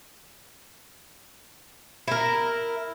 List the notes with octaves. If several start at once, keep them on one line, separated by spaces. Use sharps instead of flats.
E4 A#4